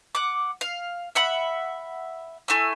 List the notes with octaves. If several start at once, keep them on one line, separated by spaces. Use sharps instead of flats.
F#5 D6
F5
E5 F#5 B5
A3 E4 G#5 E6